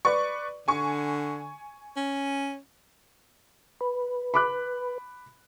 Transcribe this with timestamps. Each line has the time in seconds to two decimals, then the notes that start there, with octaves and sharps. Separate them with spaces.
0.05 B4 D5 C#6
0.68 D3 G#5 C#6
1.97 C#4
3.81 B4
4.34 B5 D6 F#6